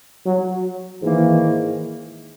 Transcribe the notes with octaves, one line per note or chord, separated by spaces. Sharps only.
F#3
G#2 D#3 E3 A#3